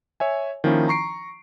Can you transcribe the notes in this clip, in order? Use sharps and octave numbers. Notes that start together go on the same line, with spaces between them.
C#5 E5 G#5
D#3 F3 A#3 C#4 D#4 E4
A#5 C#6 C7 D7